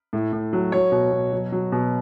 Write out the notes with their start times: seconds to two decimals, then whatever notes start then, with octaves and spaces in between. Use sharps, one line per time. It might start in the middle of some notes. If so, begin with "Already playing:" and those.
0.13 A2
0.33 A2
0.53 F#3
0.72 F#3 C#5
0.92 B2
1.12 B2
1.33 F#3
1.52 F#3
1.72 B2